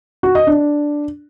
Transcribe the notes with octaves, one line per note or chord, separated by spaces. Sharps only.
F#4
D#5
D4